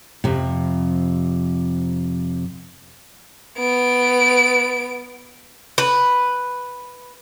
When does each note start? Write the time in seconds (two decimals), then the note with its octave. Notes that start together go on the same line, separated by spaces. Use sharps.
0.24 F2 C3
3.58 B3 D7
5.78 B4